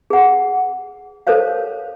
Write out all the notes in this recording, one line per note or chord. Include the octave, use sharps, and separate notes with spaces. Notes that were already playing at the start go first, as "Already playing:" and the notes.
G#4 F#5
A4 A#4 C5 C#5 F5